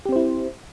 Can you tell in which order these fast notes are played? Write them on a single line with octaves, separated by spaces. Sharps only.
G4 C4 C5 E4